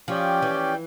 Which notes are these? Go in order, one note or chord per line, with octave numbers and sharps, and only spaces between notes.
F3 C#4 G4 D5 G5
E3